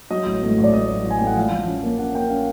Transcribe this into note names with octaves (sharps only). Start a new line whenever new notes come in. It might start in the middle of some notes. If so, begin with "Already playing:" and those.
F#3 D#5
A1
A2
A1
D5
A1 D#5
F#3
A1
G#5
A2 G5
F#5
F3 F5
F3
C#4
A#3
C#4 F#5
A#3 G5
C#4 F5